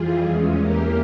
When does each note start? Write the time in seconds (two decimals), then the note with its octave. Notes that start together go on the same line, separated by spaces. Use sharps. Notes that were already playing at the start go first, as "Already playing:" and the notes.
Already playing: F2 E3 G3 F4 G#4
0.24 E2 E3 G#3 C#4
0.58 E2 E3 A#3 G4 A#4